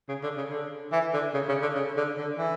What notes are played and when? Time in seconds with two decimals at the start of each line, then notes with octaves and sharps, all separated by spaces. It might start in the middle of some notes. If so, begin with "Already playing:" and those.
0.09 C#3
0.23 D3
0.38 C#3
0.51 D3
0.92 E3
1.14 D3
1.34 C#3
1.49 C#3
1.62 D3
1.75 C#3
1.97 D3
2.18 D3
2.38 E3